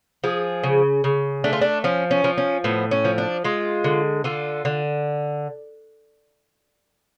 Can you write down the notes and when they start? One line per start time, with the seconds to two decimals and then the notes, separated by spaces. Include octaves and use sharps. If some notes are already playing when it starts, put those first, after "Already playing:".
0.24 F3 G#4
0.63 C#3
1.04 C#3
1.44 A3 D4
1.53 F4
1.61 D4
1.84 F3 C#4
2.11 C#4
2.24 F3
2.38 C#4
2.64 A2 B3
2.91 C#4
3.05 F3
3.18 D4
3.44 G#3 F4
3.84 D3
4.24 D3 F4
4.65 D3